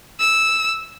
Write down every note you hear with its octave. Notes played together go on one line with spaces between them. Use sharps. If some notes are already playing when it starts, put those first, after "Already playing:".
E6